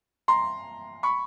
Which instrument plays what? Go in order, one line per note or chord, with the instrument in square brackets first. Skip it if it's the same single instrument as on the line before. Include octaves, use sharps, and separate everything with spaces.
[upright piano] A#5 C6
B5 C#6